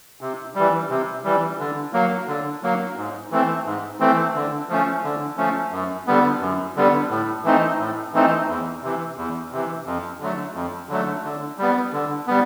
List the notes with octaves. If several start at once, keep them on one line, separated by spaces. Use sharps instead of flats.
C3
E3 G3
C3
E3 G3
D3
F#3 A#3
D3
F#3 A#3
G#2
E3 A3 C4
G#2
E3 A3 C4
D3
F3 A3 C#4
D3
F3 A3 C#4
F#2
D3 G3 B3
F#2
D3 G3 B3
A2
E3 A3 C4 D#4
A2
E3 A3 C4 D#4
E2
C3 E3
E2
C3 E3
F2
D3 F#3 A3
F2
D3 F#3 A3
D3
G3 B3
D3
G3 B3